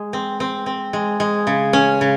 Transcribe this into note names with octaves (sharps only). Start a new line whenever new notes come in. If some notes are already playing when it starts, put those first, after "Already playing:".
Already playing: G#3
C4
C4
C4
G#3
G#3
C#3
C#4
C#3